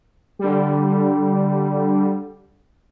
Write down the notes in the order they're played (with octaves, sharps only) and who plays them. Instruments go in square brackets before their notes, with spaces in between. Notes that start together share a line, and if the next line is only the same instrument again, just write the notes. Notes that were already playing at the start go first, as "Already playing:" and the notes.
[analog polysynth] D3 G3